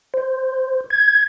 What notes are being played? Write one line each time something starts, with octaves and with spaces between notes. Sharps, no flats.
C5
G#6